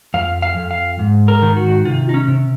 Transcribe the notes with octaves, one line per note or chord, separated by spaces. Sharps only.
F2 F5
F5
F2
F5
G#2
A#4
D#3
F#4
C3 F4
D#4
C#4
C3